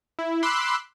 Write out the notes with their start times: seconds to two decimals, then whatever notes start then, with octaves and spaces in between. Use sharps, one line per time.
0.19 E4
0.43 B5 C6 D6 E6 F#6